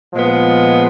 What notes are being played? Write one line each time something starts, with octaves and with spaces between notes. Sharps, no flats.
A#2 F3 G#3 B3